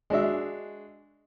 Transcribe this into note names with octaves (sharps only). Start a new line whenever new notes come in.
G#3 D4 F#4 E5